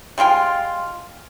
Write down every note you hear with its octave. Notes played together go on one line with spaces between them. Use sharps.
G3 G#3 F4 G5